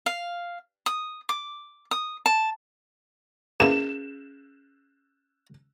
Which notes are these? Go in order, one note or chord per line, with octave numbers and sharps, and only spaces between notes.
F5
D#6
D6
D#6
A5
A#3 B3 C#4 E4 G#4 E7